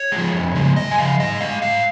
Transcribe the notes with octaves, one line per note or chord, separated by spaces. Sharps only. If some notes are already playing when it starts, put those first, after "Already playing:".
Already playing: C#5
F3 G#3
F2
C#3 F3 G#3
F2 D#5
G#5
C#3 F3 F5
G#2 D#5
G#3 F5
G#2 F5